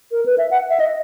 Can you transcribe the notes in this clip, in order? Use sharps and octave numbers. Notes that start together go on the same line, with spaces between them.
A#4
B4
E5
F#5
E5
D#5